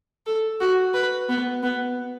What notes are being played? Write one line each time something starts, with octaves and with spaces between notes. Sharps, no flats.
A4
F#4
B4
B3
B3